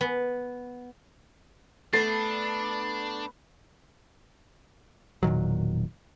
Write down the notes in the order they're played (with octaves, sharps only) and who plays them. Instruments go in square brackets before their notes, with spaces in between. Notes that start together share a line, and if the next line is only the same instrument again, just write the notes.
[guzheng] B3
[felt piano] A3 A6 C7 [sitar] B3 [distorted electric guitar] D4
[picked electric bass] E1 A#2 D#3 F#3